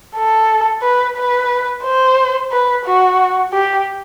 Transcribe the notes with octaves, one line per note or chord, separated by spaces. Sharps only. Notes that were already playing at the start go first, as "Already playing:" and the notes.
A4
B4
B4
C5
B4
F#4
G4